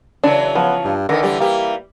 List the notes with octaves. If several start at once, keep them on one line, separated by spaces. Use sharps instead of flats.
C#3 E3 F#3 D4
F3 B3
G2
D3 D#3 B3 A#4
E3 G3 G4
E3 A#3 G4